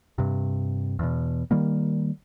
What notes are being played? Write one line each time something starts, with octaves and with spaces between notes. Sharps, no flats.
G2 C3
E2 B2
D#3 G3 A#3